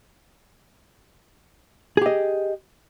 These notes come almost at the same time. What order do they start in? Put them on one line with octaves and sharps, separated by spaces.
G#4 G4 D#5